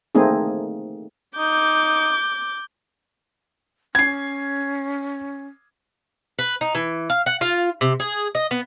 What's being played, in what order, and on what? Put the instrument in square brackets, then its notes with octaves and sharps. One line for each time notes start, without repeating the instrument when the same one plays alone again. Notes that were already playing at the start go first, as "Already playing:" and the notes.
[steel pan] A3 A#3 C4 D#4 G#4
[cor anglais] D#4 [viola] D6 [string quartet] G6
[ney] C#4 [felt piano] G#6 C7
[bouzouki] B4
D#4
E3
F5
F#5
F4
C3
G#4
D#5
B3